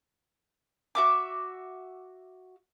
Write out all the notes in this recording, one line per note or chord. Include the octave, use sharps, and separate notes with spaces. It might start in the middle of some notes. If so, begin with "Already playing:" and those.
F#4 E5 D6